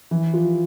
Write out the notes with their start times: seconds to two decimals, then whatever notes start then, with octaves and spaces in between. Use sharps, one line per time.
0.11 E3
0.34 F3